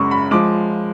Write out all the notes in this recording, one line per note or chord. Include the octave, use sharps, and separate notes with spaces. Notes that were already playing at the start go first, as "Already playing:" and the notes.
Already playing: F#2 C#3 G#3 C#6 D6
B5
F3 G#3 D6